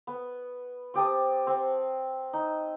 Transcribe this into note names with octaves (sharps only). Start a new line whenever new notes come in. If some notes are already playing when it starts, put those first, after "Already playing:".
B3
C4 G4 A5 D#6
C4 F#5
D#4